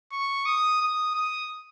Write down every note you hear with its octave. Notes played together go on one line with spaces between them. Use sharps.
C#6
D#6
D#6
D#6